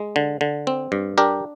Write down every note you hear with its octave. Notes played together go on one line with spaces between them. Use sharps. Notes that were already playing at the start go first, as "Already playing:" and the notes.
Already playing: G#3
D3
D3
C4
G2
D4 G4 A#4